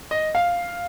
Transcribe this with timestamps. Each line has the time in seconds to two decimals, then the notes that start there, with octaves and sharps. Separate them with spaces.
0.11 D#5
0.35 F5